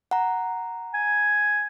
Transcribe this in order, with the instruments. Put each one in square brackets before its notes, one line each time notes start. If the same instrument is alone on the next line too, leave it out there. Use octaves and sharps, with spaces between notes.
[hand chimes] F#5 A#5
[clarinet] G#5